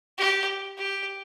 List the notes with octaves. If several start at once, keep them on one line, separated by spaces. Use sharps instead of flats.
G4
G4